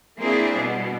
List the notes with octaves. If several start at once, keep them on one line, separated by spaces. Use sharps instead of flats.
A#3 C4 D4 E4 G#4
B2 G3